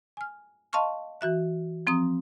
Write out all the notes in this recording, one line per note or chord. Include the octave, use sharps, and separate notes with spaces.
G#5 F6
D#5 F5 A5 C6 C#6 F6
E3 F#4 E5 F#6
F3 C4 A#5 D#6